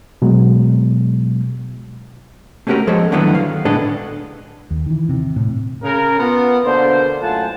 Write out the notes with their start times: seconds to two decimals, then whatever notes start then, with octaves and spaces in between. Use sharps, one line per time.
0.22 B2 F#3 G#3
2.67 A3 A#3 C#4 F#4 G4 A#4
2.87 F3 G#3 A4 C5 C#5
3.12 D3 D#3 F#3 A3 B3 E4
3.35 F5
3.65 A2 D3 G#3 B3 D4 A4
4.71 D#2
4.86 D#3 E3
5.09 C3
5.36 A2
5.84 C#3 A#4
6.19 B3 F4
6.65 B2 D3 A#3 C5
7.22 F#2 A2 F4 F#5 G#5 A5